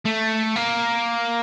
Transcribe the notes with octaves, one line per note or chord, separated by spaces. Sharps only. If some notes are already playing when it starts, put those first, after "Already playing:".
A3
A#3